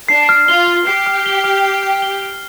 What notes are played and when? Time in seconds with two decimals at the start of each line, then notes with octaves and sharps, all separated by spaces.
0.09 D4 C7
0.29 F6
0.48 F4 G7
0.67 F6
0.87 G4 C7
1.06 F6
1.26 G7
1.44 F6
1.65 C7
1.83 F6
2.02 G7
2.23 F6